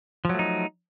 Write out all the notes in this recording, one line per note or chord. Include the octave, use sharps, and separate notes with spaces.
F3 F#3 A3 D#4